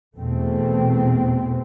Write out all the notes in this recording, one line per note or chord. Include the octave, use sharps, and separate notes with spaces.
E2 B2 A3 C4